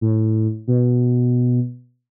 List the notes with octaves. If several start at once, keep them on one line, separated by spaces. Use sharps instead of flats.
A2
B2